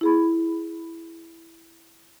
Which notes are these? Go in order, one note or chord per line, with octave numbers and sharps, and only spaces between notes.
E4 G#4 B5